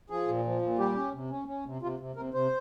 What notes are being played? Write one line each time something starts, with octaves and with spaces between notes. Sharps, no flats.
F3 G#4
A#2
F3
A#2
G3 G4
C#4
C3
C#4
C#4
C3
C3 F4
C3
C3 A#4
C3 C5